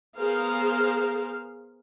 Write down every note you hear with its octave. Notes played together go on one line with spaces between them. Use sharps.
B3 G#4 A#4 C5 F5